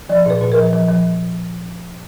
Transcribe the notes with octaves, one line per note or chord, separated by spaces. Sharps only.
F3 D5
A#2 B4
A#2
A#4
F3
F3
F3